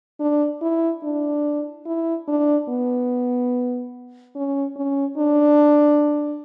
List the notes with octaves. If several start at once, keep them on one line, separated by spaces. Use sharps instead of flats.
D4
E4
D4
E4
D4
B3
C#4
C#4
D4